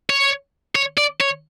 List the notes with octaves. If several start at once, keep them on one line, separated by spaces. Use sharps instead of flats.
C#5
C#5
D5
C#5